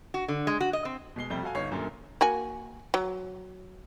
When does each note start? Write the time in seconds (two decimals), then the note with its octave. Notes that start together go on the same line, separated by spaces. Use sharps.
0.14 F#4
0.28 D3
0.47 G#3
0.61 F#4
0.73 D#5
0.85 C4
1.16 B2 G#3 C7 G7
1.30 F2 C3 G3 A3 G7
1.43 F#4 A4 F5 G#5
1.55 G1 D#4 C#5 F5 C7
1.71 D#1 F#2 A#2 D3
2.21 A#3 F#4 G#5
2.94 F#3